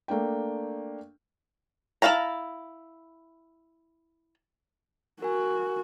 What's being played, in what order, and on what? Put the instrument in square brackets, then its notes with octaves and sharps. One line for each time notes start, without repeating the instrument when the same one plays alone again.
[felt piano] A3 A#3 D4 G5
[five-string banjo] E4 G#4 F5 A5 A#5
[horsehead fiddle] F#4 [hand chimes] A#4 G#5